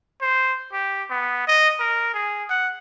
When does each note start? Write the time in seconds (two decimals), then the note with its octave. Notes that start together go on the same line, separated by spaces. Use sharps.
0.22 C5
0.73 G4
1.10 B3
1.47 D#5
1.80 A#4
2.14 G#4
2.49 F#5